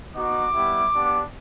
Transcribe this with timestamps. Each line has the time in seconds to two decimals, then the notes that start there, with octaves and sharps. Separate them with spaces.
0.15 B3 D#4 F#4 D6
0.53 G3 B3 E4 G4
0.92 B3 D4 G4